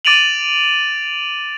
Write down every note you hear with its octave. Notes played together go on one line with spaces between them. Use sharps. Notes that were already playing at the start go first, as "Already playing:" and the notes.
D6 A6 D7 D#7 F7 F#7